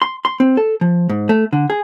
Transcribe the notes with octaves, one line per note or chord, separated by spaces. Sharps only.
C6
C6
C4
A4
F3
G#2
A3
D3
G#4